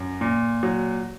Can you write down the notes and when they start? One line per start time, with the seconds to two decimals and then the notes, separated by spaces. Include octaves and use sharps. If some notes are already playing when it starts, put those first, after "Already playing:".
Already playing: F#2
0.21 A#2
0.63 F#3